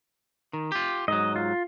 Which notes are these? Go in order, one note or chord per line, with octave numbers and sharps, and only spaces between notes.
D#3
F4 G4
G#2 F#3 D#5
F4